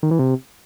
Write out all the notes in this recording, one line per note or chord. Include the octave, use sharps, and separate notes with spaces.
D#3
E3
C3